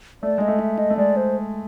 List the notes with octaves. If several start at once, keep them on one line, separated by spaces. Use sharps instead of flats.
A3 D5
G#3 D#5
A3
E5
D#5
A3
G#3 D5
C5